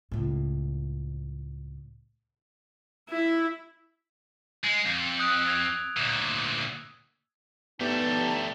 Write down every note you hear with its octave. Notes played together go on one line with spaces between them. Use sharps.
C#2 A2
E4
G#3
F2
D#6 F#6 D7
E6 G#6 F7
D2 A#2
G2 A3 B3 D#4 G4 A5